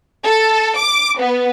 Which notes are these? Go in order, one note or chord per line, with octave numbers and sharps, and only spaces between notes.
A4
D6
B3